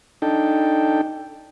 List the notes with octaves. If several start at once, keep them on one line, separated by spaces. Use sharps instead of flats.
D4 D#4 A4 G5